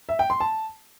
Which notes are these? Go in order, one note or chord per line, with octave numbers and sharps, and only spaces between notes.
E5
G5
C6
A5